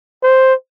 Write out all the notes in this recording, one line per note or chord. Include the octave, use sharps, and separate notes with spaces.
C5